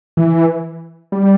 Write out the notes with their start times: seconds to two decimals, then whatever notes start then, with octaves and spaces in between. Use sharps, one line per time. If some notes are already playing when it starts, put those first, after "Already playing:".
0.17 E3
1.12 G3